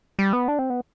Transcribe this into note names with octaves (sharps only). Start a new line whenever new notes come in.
G3
B3
D4
C4
B3